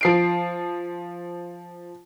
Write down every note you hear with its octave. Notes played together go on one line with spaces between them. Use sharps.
F3 C7 D7